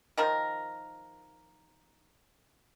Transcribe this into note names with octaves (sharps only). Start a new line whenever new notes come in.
D#3 F3 A#4